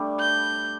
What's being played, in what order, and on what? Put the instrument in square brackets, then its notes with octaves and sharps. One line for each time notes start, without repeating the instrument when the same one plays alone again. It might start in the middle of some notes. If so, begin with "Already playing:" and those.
Already playing: [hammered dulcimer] G3 A3 D4
[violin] G6